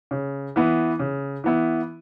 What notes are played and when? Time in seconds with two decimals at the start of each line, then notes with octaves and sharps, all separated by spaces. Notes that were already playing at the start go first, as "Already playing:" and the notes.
0.11 C#3
0.56 E3 B3 E4
0.99 C#3
1.44 E3 B3 E4